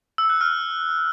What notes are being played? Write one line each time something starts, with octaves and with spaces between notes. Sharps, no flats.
E6
F#6
F6